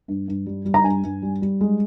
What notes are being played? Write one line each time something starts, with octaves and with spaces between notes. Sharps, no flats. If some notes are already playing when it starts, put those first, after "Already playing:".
G2
G2
G3
G3
A#5
G2 G#5
G2
G3
G3
G#3